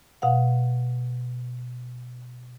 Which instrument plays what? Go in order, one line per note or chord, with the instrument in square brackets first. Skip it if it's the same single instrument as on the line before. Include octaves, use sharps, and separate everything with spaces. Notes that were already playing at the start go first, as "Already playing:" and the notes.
[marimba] B2 F5 F#5